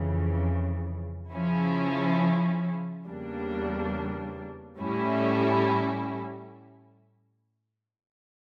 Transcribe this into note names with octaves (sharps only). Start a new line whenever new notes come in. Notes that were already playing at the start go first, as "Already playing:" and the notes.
Already playing: F2 C#3 E3
C#3 F3 C#4 E4
E2 C#3 G3 A#3 D4
A2 G3 C#4 E4